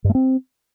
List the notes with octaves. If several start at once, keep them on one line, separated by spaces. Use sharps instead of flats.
G2
A3
C4